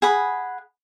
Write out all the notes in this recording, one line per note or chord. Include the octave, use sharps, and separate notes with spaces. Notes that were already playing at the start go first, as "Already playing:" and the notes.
G#4 F#5 B5